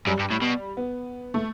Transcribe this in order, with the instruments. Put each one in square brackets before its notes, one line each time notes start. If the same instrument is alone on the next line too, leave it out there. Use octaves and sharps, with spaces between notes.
[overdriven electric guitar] F#2 [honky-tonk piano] G3
[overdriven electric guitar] G2
A2
B2
[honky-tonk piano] B3
A3